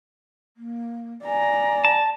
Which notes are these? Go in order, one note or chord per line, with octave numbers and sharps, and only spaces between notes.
A#3
D5 G#5 A#5
A5